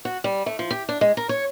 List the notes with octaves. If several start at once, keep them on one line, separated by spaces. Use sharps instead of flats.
F#4
G3
A3
F3
G4
D4
G#3
A#4
C#5